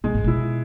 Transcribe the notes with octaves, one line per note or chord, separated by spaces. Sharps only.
B2 G#3
G#2
B2 E4